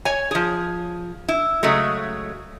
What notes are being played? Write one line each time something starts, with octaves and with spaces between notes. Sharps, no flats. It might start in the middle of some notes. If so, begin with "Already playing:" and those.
C#5 G#5
F3 G#4
E4
C#3 F#3 G#3 A3